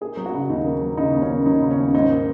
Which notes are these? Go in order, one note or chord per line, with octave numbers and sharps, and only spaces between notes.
A#3 G#4
F#3
F#4
C#3
D#2 D#4
A#3
F#3
C#3 D#4
D#2
C#4
A#3
F#3 D#4
C#3
C#4
D#2
G#2 D#4
A#3